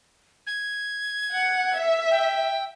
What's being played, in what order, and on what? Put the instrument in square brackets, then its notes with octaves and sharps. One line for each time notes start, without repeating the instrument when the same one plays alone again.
[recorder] G#6
[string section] F#5
E5
[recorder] G5